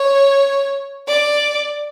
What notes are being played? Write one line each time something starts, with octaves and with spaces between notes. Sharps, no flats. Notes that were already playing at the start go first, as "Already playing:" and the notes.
Already playing: C#5
D5